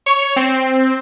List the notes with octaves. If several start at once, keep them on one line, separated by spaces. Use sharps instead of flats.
C#5
C4